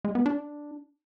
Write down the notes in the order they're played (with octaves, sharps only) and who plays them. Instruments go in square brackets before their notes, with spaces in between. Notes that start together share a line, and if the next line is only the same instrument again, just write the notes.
[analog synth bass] G#3
B3
D4